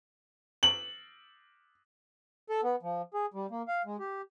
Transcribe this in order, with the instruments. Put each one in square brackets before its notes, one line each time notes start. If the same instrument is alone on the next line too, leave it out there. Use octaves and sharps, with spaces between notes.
[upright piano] F#7
[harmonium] A4
B3
F3
G#4
G3
A#3
F5
G#3
G4